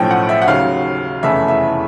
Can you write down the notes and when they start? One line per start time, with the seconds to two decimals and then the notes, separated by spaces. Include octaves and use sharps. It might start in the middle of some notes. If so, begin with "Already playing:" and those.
Already playing: B1 A2 F3 A3 C#4 G5
0.11 F#5
0.29 E5
0.42 F#5
0.48 D#2 C#3 F#3 F5
1.23 F1 E2 C#3 E3 A3 E5
1.48 E5